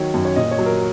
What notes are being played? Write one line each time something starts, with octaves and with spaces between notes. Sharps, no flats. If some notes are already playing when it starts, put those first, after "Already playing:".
Already playing: D#3 F#3 C#5
F#2
C#5
A#2 D#5
C#5
F#3
A#4